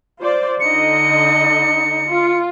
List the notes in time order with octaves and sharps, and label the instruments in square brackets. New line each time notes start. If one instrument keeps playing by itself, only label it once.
[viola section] F4 C5 D5
[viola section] D3 D#4 D#5 [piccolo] C#7
[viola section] F4